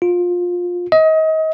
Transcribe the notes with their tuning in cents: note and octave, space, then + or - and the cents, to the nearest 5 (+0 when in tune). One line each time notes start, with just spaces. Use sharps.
F4 +20
D#5 +30